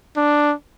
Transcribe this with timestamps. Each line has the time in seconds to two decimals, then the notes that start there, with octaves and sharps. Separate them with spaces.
0.17 D4